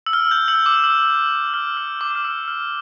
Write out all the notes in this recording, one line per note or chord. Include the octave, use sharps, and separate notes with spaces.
E6
F6
G6
E6
D6
E6
F6
E6
D6
F6
E6
F6